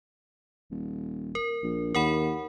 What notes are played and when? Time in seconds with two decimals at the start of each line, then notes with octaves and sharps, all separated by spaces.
0.71 D#1
1.35 A#4
1.63 A#1
1.95 D#2 A#4 F#5 B5